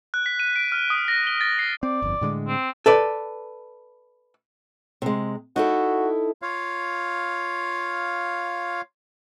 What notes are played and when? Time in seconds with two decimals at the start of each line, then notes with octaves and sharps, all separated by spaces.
0.14 F#6
0.26 B6
0.40 D#7
0.56 D7
0.72 F6
0.90 D#6
1.08 A#6
1.27 G7
1.41 A6
1.59 C7
1.83 C4 D5
2.02 G1 F2
2.21 A2 D3 G#3
2.48 C4
2.86 A4 B4 D5
5.02 C3 G#3
5.56 D#4 E4 F#4 A4
6.42 F4 C#5 F5